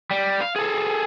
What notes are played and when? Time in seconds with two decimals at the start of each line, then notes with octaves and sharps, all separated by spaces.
0.11 G3
0.41 F5
0.56 G#4 A4